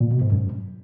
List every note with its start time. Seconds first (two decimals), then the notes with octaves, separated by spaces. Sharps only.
0.01 A#2
0.11 B2
0.21 G#2
0.32 F#2